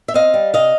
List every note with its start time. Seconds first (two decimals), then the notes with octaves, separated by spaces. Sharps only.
0.08 E5
0.14 C4 D#5 F5
0.34 G3
0.53 C3 D#5 F5